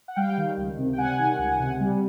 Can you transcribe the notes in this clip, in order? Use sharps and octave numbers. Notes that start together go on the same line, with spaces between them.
F#5
G3 F5 G5
D#3
C#2
C3
G5
G3 F#5 G#5
D#3
C#2
C3
G3